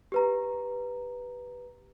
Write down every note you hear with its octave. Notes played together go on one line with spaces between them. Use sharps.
G4 B4 A#5